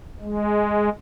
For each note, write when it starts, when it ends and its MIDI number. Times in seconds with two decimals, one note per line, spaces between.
0.20 0.89 56